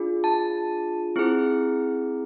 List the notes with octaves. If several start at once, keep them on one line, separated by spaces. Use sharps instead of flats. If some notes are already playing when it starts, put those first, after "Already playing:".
Already playing: D4 F4 G#4
A5
C4 E4 G#4